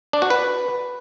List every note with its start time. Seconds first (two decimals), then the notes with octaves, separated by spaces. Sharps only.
0.13 D4
0.22 F#4
0.30 B4